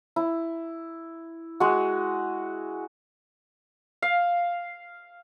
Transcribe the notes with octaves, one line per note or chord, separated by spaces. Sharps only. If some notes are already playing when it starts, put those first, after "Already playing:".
E4
G#3 F#4
F5